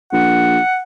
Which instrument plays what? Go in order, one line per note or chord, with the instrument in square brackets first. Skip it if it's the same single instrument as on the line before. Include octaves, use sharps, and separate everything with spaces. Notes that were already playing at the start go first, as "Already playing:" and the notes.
[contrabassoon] A#1 [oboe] F#5